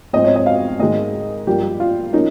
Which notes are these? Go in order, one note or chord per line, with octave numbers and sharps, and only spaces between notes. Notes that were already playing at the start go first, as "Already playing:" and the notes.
G#2 F3 C4 D#5
C#5
D#5
F5
G#2 D#3 G#3 D#5
G2 F3 A#3 G4
F4
F3 A#3 C#4 D#4